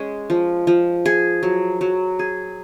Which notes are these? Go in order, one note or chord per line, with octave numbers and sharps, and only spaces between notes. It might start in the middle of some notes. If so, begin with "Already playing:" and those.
Already playing: G#3 C#4
F3
F3
G#4
F#3
F#3
G#4